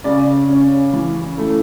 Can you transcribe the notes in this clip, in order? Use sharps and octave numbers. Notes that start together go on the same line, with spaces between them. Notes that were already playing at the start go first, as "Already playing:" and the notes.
C#3 D5
C#4
E3
A3